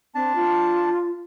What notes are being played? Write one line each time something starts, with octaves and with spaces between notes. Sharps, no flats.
C4 D4 A5
F4